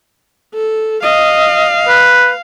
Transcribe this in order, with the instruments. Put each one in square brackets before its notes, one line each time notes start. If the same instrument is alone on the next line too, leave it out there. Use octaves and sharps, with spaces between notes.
[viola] A4
[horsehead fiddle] D#5 [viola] F5
[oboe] B4